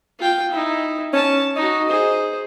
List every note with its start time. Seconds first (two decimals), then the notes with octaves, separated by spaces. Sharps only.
0.19 F4 G5
0.51 D#4 E4
1.13 C#4 C#5 A5
1.56 D#4 F#4 D#5
1.89 G#4 C5